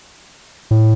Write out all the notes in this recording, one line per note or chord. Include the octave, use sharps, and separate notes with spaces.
A2